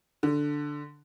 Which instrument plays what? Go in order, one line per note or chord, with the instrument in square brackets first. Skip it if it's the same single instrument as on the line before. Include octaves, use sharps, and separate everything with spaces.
[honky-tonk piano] D3